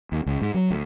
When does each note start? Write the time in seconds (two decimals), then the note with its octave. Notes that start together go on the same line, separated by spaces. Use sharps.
0.12 D#2
0.26 C#2
0.42 G#2
0.54 F#3
0.71 D2